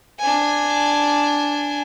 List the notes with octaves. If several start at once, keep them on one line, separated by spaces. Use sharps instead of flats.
D4 G#5